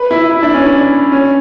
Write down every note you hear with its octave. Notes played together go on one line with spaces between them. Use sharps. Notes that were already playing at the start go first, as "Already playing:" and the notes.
Already playing: B4
E4
E4
D4
C#4
D4
C#4